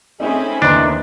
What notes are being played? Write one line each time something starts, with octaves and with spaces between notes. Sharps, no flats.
A3 C4 C#4 D#4 G#4 B5
D#2 E3 A3 D4 D#4 C6